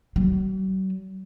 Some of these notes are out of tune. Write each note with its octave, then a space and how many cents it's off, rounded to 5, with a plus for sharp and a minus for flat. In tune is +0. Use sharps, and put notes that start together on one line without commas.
F#3 +45